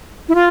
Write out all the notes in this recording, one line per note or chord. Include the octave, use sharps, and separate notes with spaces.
E4
F4